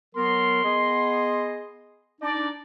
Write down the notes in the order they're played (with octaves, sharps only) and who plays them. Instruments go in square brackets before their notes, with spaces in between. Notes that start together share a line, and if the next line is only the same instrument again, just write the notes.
[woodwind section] F#3 B3 A#4 [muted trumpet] C6
[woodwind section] B3 G#4 D#5
[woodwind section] D4 D#4 [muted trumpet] D5